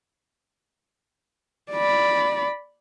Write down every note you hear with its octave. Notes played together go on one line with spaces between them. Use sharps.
D5 B5